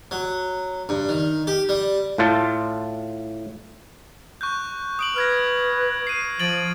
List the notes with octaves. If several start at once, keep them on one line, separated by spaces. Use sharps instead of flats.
F#3
G2
D#3
G4
G3
A2 F4 A5
C#6 F#6 G6
D#6 D7 F#7
B4 F6 G#6 A#6
C7 D#7
F3 A6 D7 F#7